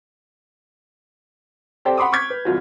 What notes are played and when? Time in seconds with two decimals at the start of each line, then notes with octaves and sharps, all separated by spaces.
1.85 C4 G4 A4 C5 D5 G5
1.97 F#5 B5 C6 D6 D#6
2.12 C#6 D6 F6 G6 G#6 B6
2.30 B4
2.45 E1 C2 F4 F#4